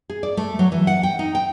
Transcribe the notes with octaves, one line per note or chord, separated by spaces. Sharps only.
G#4
D5
A3
F#3
E3
F#5
G5
D#4
G5